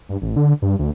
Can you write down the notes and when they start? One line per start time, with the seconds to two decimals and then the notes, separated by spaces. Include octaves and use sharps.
0.09 G2
0.22 A1
0.36 D3
0.62 G2
0.79 D2